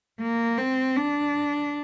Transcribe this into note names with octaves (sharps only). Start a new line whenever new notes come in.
A#3
C4
D4